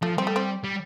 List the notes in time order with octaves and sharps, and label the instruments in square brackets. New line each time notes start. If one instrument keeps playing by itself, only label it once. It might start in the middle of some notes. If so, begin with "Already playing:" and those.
[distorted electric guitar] F3 [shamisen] A3
[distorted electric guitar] G3 [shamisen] C4
[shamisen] A3
C4
[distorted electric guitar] G3